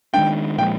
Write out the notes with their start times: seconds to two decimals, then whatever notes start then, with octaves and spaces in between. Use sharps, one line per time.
0.14 D#3 G#3 D4 G5
0.58 A#2 F3 G#3 G5